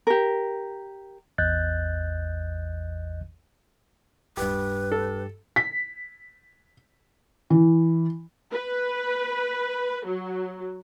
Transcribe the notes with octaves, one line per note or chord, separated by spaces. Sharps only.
G4 A#4
A1 E2 D#5 F#6 G6 A6
D1 G2 G4 B4
A4
B6
E3
B4
F#3